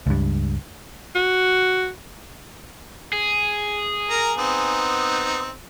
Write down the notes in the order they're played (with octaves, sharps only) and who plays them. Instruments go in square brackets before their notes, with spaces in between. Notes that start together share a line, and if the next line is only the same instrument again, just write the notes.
[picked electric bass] C#2 G2
[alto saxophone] F#4
[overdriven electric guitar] G#4
[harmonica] A#4 A#5
B3 C4 D#4